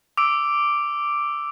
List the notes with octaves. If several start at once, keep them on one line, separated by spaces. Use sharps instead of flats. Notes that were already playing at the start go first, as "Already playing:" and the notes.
D6 E6 D7